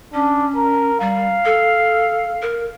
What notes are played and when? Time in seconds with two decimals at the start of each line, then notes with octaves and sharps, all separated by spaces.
0.14 C#4 D4
0.56 A#4
1.00 G3 F5
1.45 A4
2.42 A#4